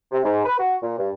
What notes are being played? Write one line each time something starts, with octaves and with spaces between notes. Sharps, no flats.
C3
G#2
B4
F#4
A#2
G2